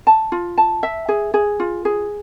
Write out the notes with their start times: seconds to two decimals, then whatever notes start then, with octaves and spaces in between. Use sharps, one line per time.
0.07 A5
0.32 F4
0.58 A5
0.83 E5
1.09 G#4
1.34 G#4
1.60 F4
1.85 G#4